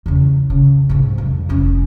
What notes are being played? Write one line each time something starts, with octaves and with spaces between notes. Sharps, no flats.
E2 C#3
C#3
G#2 C3
F2
F1 C#4